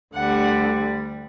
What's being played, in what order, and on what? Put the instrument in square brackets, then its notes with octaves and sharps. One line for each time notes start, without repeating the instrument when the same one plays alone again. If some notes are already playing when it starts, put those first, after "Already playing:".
[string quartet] D2 D3 G3 F#5